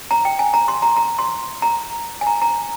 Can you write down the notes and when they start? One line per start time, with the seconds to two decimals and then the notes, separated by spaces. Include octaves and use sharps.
0.11 A#5
0.25 G5
0.39 G#5
0.54 A#5
0.68 C6
0.82 A#5
0.97 A#5
1.19 C6
1.62 A#5
2.21 G#5
2.27 A#5
2.42 A#5